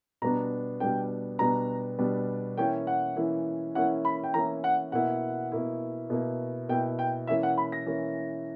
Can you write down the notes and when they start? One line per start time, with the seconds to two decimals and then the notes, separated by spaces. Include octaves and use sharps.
0.22 B2 G3 B3 D4 A#5
0.80 B2 G3 B3 D4 G5
1.39 B2 G3 B3 D4 A#5
1.98 B2 G3 B3 D4
2.57 E3 A#3 C#4 E4 G5
2.87 F#5
3.16 E3 A#3 C#4 E4
3.75 E3 A#3 C#4 E4 F#5
4.05 B5
4.24 G5
4.34 E3 A#3 C#4 E4 A#5
4.64 F#5
4.92 B2 A#3 E4 F#5
5.52 B2 A#3 E4
6.10 B2 A#3 E4
6.69 B2 A#3 E4 G5
6.99 G5
7.27 E3 A#3 C#4 E4 E5
7.43 F#5
7.58 B5
7.72 A#6
7.86 E3 A#3 C#4 E4